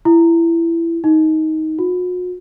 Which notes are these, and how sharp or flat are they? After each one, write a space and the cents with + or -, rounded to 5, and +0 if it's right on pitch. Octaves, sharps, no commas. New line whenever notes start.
E4 +20
D#4 +15
F#4 -40